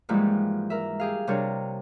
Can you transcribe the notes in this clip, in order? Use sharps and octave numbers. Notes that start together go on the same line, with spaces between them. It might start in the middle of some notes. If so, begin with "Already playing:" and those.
G#2 E3 F3 G3 G#3 A#3
A#4 E5
G4 G#4 F5
C3 G3 C4 D4 A#4 C#5